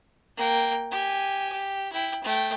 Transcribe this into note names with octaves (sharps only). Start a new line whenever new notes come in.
A#3 G5
G4 G#5
G4
E4 G5
A3 G5